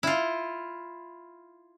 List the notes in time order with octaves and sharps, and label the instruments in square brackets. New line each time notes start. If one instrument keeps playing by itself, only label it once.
[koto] E4 F4